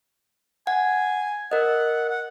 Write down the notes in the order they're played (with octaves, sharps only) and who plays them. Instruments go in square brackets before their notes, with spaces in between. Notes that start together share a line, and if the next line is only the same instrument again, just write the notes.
[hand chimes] F#5 [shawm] G#5
[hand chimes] A#4 D#5 [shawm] F#5
[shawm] F#5